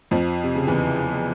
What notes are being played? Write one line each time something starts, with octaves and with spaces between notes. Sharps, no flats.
F2 F3
C3
C#3
E2 E3